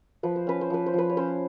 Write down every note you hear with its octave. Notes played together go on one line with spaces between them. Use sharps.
F3 B4
C5
C#4 B4
C5
F3 B4
C5
F3 B4
C#5
C#4 C5